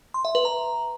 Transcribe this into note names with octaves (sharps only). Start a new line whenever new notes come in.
C6
E5
B4
A#5